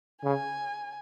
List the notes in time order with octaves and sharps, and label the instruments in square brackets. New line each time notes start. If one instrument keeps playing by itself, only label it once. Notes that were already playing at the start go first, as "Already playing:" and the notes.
[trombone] C#3 [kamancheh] G#5